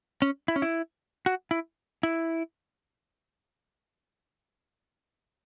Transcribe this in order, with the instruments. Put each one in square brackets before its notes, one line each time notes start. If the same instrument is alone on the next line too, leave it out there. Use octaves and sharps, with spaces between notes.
[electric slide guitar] C#4
E4
C#4
E4
F#4
E4
E4